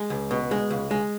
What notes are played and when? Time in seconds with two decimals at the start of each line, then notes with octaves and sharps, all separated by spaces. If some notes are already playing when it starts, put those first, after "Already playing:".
Already playing: G#3
0.10 C#2
0.31 B2
0.51 G#3
0.71 C#2
0.91 G#3